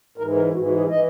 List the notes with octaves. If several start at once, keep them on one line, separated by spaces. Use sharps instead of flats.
G#2 E3 A#4
A#4
G#2 E3 F#4
F#4
G#4
E3 D#5